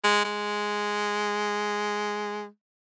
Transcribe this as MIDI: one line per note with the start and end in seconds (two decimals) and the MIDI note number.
0.04 0.24 56
0.25 2.47 56